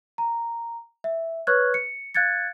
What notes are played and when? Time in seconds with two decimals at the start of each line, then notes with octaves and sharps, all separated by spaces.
0.18 A#5
1.04 E5
1.47 B4 C#5 C#6 F6 F#6 G#6
1.74 C#7
2.14 F5 F#6 G#6 A6 C#7